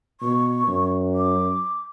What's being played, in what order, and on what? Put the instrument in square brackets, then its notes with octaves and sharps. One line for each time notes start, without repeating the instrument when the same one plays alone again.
[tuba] B2 [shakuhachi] C#6
[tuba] F#2
[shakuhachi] D6